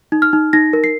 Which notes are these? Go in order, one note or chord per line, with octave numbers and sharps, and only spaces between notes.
D#4
F6
D#4
D#4 A#6
A#4
C7